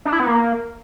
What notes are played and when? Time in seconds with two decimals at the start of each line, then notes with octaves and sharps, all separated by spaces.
0.05 D4
0.13 E4
0.20 B3
0.27 A#3